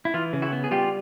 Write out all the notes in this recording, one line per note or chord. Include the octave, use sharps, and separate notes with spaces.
E4
E3 F4
C#3
E4 F#4
B3
G#4
G3 F4 G4